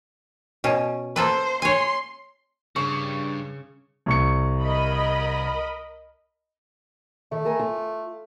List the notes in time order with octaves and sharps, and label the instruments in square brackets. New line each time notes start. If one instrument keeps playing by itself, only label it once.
[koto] B2 C#4
[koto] A#3 A4 B4 [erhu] C5
[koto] C#5 G#5 [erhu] C6
[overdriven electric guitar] G2 [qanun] C#3 D4 [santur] C#6 D6
[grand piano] C2 C#6 C#7
[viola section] A#4 D#5 B5
[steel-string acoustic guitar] D#3 [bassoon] A3
[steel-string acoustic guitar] A4 A#4 G#5
F4